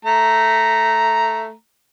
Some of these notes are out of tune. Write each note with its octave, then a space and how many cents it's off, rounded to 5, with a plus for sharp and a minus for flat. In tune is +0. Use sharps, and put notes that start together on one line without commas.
A3 +0 A#5 +0